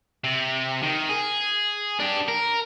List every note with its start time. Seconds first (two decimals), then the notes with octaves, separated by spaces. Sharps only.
0.24 C3
0.82 D#3
1.09 G#4
2.00 D4 G4
2.28 A#4